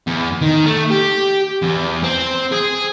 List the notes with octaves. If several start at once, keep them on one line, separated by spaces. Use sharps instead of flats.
E2
D#3
A3
G4
E2
C4
G#4